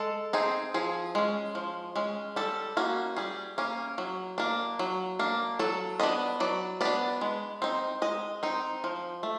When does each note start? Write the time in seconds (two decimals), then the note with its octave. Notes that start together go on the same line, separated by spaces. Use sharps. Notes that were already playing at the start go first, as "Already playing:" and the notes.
Already playing: G#3 A4
0.33 C4 D#4 G#4
0.74 F3 G#4
1.15 G#3 C#4
1.55 F3
1.96 G#3 C#4
2.36 G3 A4
2.77 A#3 C#4 F#4
3.16 G3 G#4
3.58 A#3 C#4
3.98 F#3
4.38 A#3 D4
4.79 F#3
5.19 A#3 D4
5.59 F#3 A4
6.00 B3 D4 D#5
6.40 F#3 D5
6.81 B3 D4 D5
7.21 G#3
7.62 C4 D#4
8.02 G#3 D#5
8.43 C4 D#4
8.84 F3
9.23 A3